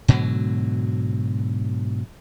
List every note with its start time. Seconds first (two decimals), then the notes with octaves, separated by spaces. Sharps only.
0.08 G#2 B2 D3 F#3